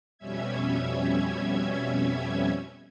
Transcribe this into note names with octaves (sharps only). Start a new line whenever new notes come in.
F2 B2 G3 C#4 E5 G#6